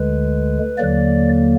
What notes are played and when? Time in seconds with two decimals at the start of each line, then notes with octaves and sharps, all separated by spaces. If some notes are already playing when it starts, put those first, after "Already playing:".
Already playing: D2 D3 G#3 B4
0.78 D#2 D3 F#3 A#3 D5